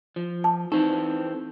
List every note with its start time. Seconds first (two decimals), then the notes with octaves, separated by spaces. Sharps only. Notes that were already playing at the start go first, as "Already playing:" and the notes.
0.16 F3
0.44 A5
0.72 E3 C4 D#4 A4